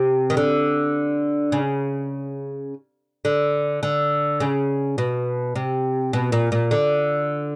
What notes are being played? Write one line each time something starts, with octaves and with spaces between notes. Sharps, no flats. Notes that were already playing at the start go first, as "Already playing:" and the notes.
Already playing: C3
D#3
D3
C#3
D3
D3
C#3
B2
C3
B2
A#2
A#2
D3